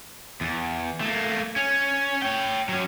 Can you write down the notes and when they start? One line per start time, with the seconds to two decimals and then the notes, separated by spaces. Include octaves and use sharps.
0.41 E2
1.01 A3 A#3
1.56 C#4
2.22 C#5 G5
2.69 F#3 C#4